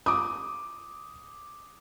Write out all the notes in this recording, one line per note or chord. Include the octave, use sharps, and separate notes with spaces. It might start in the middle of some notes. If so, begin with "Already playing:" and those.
D6 D#6